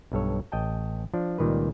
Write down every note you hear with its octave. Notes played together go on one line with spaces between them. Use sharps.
B1 G2 A4 C#5
A1 D#5 G5 A5
F3 D4
C#2 A#2 D#3 G3 B4